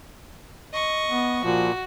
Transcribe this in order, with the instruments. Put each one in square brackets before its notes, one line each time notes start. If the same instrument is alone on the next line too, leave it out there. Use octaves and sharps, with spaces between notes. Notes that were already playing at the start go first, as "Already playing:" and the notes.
[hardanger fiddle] D#5 C#6
[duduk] B3
[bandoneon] A#2 [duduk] F3 [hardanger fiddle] F#4